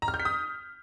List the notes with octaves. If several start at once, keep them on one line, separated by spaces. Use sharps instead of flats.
A#5
F6
G6
B6
D#6